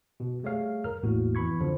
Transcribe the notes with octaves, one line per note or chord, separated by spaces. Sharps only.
B2
G3 A3 G#4 C#5 F5
A#4 A#5 F6
A1 E2 A2 A#3 F#4
F2 E3 B3 B5 C#6 G#6
F2 D3 F3